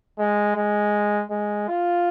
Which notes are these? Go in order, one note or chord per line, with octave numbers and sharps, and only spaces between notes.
G#3
G#3
G#3
F4